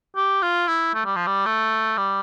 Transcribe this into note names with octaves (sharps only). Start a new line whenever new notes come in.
G4
F4
E4
A3
G3
F3
G3
A3
G3